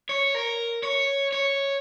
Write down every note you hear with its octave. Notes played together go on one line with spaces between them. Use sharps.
C#5
A#4
C#5
C#5